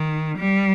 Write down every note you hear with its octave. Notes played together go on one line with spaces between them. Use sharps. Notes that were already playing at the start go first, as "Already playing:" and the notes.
Already playing: D#3
G3